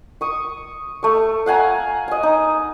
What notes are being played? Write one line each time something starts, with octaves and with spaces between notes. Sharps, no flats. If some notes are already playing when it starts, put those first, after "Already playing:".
C#6 D#6
A3 C#6
F5 F#5 G#5 A#5
D#5 G#5
D#4